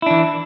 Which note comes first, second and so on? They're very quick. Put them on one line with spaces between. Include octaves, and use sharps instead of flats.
E4 D4 E3